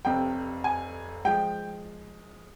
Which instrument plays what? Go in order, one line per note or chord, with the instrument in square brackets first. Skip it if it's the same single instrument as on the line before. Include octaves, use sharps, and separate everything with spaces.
[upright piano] F1 F2 C3 G5
G#5
F3 G#3 G5